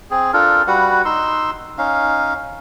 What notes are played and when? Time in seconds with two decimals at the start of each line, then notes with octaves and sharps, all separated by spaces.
0.11 C4 G#4
0.33 D4 F4 A4 A#4
0.67 G3 F#4 B4 F#5
1.05 D#4 C6 E6
1.78 C#4 D#4 F5